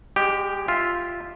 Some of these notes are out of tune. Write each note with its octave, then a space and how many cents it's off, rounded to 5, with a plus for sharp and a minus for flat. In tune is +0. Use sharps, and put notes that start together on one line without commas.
G#3 -30 G4 +0
F4 +0 E5 +0